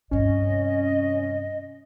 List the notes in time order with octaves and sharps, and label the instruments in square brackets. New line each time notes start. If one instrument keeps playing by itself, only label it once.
[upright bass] G2 C3 [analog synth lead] C#4 [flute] D#5